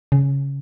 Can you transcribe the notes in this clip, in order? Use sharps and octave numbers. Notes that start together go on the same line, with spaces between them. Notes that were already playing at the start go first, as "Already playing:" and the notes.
C#3